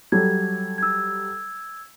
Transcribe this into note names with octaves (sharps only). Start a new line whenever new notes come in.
F#3 G3 A4 G#6
E6 G#6